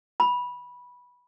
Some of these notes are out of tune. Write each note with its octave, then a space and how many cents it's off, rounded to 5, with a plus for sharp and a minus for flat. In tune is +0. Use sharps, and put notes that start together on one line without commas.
B5 -10